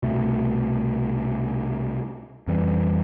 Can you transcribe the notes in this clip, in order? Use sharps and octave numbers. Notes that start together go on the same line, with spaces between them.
C2 B2 A3
F2 E3 G3